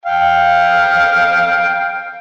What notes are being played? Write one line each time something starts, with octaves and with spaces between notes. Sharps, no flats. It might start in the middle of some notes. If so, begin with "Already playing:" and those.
F5 G5